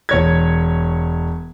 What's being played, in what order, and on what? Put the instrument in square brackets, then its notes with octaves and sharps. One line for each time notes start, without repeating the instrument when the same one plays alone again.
[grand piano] E1 C#5 G#6